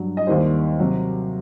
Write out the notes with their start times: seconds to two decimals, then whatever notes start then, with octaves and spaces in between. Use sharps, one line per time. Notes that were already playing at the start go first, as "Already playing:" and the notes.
Already playing: G2 F#3
0.17 D#5
0.27 D#2 D#3 G3 C5
0.79 C3 F#3